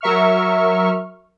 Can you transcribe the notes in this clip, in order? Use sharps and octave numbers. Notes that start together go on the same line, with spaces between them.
F#3 A#4 E5 C#6 F6